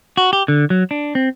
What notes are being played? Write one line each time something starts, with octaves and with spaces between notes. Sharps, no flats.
F#4
G4
D3
F#3
D4
C4